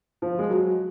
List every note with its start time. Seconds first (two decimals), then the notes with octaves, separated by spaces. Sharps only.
0.22 F3
0.39 G#3
0.50 F#3